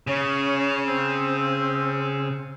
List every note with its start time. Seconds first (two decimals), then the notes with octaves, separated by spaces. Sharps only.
0.07 C#3 C#4
0.86 C4